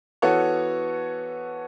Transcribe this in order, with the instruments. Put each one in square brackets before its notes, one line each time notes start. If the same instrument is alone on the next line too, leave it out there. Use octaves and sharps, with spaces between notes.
[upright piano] E3 B3 F#4 A4 C#5